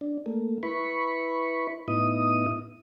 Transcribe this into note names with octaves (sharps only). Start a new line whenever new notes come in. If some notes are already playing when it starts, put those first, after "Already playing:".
D4
A3 A#3
E4 B4 B5 C#6
A2 B3 D#4 E4 D#6